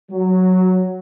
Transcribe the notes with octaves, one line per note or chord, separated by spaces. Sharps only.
F#3